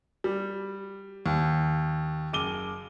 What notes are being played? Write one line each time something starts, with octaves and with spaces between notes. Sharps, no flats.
G3
D#2
F#1 D6 D#7 G7